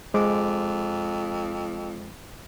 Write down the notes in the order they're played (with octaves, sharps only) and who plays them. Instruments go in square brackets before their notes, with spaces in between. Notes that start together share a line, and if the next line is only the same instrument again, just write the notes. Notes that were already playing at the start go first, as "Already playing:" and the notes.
[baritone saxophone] F2 [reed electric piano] G#3 C5 D6